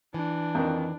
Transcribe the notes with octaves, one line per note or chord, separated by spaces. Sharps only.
E3 D4
F2 D#3